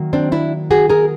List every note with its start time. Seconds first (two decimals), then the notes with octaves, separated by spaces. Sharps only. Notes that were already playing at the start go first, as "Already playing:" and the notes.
Already playing: D#3 F#3 A#3
0.13 C4 D4
0.32 D4 E4
0.71 F#4 G#4
0.89 G#4 A#4